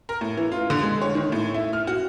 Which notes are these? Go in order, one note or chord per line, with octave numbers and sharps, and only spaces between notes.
A#4
A2
E3
F4
D3
G#3
C#5
D#3
A2
E4
F6
F#4